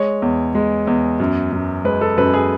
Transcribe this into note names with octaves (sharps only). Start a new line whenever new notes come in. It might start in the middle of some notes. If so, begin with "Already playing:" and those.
Already playing: G#3 C#5
E2
G#3
E2
F#2
F#2
G#3 B4
A4
F#2 B4
G#4